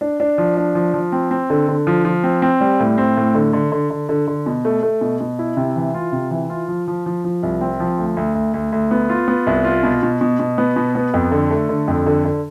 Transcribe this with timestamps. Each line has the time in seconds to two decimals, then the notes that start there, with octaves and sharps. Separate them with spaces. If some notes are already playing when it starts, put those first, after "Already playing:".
0.01 D4
0.20 D4
0.38 F3
0.57 D4
0.75 F3
0.94 F3
1.12 C4
1.31 C4
1.50 D3
1.68 D3
1.87 F3
2.05 F3
2.23 C4
2.42 C4
2.61 G3
2.80 A2
2.98 C4
3.17 A2
3.35 D3
3.53 D3
3.72 D3
3.90 D3
4.09 D3
4.27 D3
4.46 B2
4.65 A3
4.83 A3
5.01 B2
5.20 B2
5.39 E4
5.57 C3
5.76 E3
5.94 F4
6.12 C3
6.31 E3
6.50 F4
6.68 F3
6.88 F3
7.06 F3
7.24 F3
7.43 C2
7.61 C4
7.80 F3
7.98 D2
8.17 D2
8.35 D2
8.54 D2
8.72 D2
8.91 B3
9.10 F4
9.28 B3
9.47 C2
9.65 F4
9.83 B2
10.03 B2
10.21 B2
10.39 B2
10.58 B3
10.76 B2
10.95 B3
11.14 F2
11.31 D3
11.50 A3
11.69 D3
11.88 F2
12.06 D3
12.25 D3